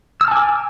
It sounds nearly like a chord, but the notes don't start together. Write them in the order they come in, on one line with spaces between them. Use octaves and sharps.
E6 F6 A5 G#5 D6